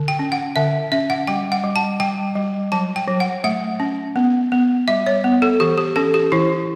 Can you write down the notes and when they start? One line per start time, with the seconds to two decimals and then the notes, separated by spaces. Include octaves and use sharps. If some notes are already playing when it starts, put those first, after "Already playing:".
Already playing: D3
0.08 G5
0.19 C#4
0.32 F#5
0.56 D3 E5
0.92 C#4 E5
1.10 F#5
1.27 G3 G5
1.52 F#5
1.64 G3
1.76 A5
2.00 G3 G5
2.35 G3
2.72 F#3 A5
2.96 G5
3.08 F#3
3.20 F#5
3.44 A3 F#5
3.80 C#4
4.16 B3
4.52 B3
4.88 G3 E5
5.06 C#5
5.24 B3
5.42 A4
5.60 E3 G4
5.78 G4
5.96 C#4 A4
6.14 G4
6.32 E3 E4